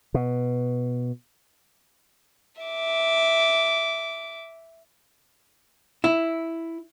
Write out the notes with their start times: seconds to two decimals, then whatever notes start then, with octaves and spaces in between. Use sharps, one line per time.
0.14 B2
2.62 E5 D6
6.04 E4